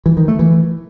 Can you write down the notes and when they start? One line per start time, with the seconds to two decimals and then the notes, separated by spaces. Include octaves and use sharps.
0.06 E3
0.17 D#3
0.28 A3
0.39 E3